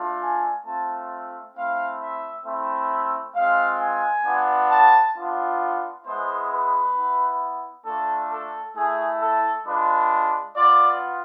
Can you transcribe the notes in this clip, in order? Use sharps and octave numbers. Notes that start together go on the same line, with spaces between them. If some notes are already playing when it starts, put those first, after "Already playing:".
Already playing: A3 D4 F4
G#5
A3 C4 F4 A5
A3 C4 E4 F5
E5
A3 C4 E4 E5
G#3 C4 F4 F5
G#5
B3 D4 F4
A5
B3 D4 F4
G#3 B3 E4 C5
B4
B3 E4
A3 D4 F4 A4
A4
A3 E4 G#4
A4
G#3 D4 F4 B4
B3 F4 D5